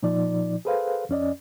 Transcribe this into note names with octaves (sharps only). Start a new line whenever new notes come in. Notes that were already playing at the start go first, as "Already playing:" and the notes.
A#2 F3 D#4 D5
G#4 A4 B4 C5 F5
F2 C#4 D5 D#5